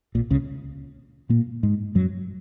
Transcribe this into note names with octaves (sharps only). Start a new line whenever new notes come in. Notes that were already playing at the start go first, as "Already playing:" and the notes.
A#1 A#2
C#2 C#3
A#2 A#3
G#2 G#3
F#2 F#3